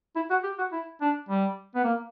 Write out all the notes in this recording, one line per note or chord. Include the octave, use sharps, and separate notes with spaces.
E4
F#4
G4
F#4
E4
D4
G3
B3
A#3